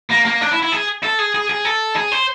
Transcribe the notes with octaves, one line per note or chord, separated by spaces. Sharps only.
A#3
A#3
D4
E4
E4
G#4
A4
G#4
G#4
G#4
A4
G#4
C5